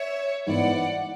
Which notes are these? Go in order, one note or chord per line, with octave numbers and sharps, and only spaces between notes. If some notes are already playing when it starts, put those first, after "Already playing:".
Already playing: C#5 E5
G#2 E3 B3 D5 F#5